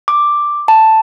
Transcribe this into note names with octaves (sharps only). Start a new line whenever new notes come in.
D6
A5